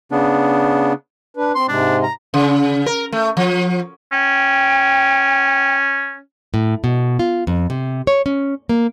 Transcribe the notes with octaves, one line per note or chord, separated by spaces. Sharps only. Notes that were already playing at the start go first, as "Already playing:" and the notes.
C#3 B3 D4
D4 B4
C4 C6
G#2 C3 G#3 D4
A#5
C#3
A#4
A3
F3
C#4 G5
A2
B2
F4
F2
C3
C#5
C#4
A#3